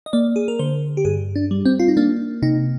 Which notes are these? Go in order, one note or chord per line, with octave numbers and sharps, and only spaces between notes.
D#5
A#3 D5
G#4
A#4
D3 C5
G4
G2 G#4
D4
G3
C4
F4
D#4
A#3 D4
C3 D#4